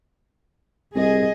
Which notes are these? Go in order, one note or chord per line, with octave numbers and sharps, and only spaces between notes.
C2 G#4 D#5